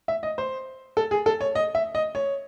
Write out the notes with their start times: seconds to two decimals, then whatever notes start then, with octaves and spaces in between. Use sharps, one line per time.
0.08 E5
0.23 D#5
0.38 C5
0.97 A4
1.11 G#4
1.26 A4
1.41 C#5
1.55 D#5
1.75 E5
1.95 D#5
2.15 C#5